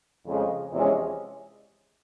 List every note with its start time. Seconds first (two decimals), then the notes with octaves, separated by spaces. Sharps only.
0.26 F2 C#3 F3 G#3
0.72 E2 C3 F3 G#3 C#4